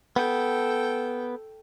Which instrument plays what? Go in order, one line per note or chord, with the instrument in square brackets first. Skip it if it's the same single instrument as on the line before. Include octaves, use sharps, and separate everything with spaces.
[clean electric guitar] B3 [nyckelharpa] A4 G5